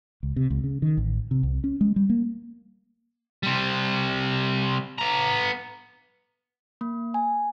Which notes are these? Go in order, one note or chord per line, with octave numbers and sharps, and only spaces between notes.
C#2
C3
C#2
C#3
D#3
A1
C3
C2
C#4
G#3
G3
A#3
C3 G3
B3 A#5
A#3
G#5